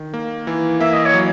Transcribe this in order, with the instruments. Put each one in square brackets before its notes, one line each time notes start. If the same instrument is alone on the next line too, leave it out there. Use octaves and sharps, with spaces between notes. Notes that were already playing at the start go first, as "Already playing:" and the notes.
Already playing: [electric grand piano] D#3
A#3
E3
[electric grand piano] A#3 [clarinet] E5
[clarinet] D#5
C#5
[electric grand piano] F#3